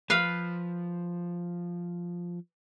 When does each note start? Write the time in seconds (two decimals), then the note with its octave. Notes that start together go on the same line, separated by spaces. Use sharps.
0.10 F3 B4 F5